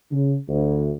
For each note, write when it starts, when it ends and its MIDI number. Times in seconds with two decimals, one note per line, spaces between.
0.11 0.35 49
0.48 0.91 38